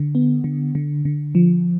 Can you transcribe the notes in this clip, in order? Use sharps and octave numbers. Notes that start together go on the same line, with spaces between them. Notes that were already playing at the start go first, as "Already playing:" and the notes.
Already playing: D3
B3
D3
D3
D3
F3